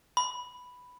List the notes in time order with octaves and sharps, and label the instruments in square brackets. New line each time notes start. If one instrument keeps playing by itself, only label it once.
[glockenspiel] B5